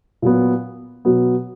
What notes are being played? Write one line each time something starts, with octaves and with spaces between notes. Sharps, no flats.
A#2 F#3 B3
B2 F#3 B3